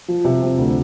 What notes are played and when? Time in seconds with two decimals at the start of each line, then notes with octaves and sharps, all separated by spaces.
0.08 F3
0.25 C3
0.42 C4
0.58 D2